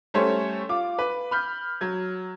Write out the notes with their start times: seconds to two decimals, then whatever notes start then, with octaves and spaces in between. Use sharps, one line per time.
0.14 G3 A3 C#4 A4 C5 C#5
0.69 F4 D6
0.99 B4
1.31 B5 F6 G6
1.81 F#3 G#6